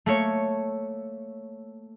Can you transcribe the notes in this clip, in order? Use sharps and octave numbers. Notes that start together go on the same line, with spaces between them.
A3 A#3 C#5